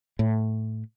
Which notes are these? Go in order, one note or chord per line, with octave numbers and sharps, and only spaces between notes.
A2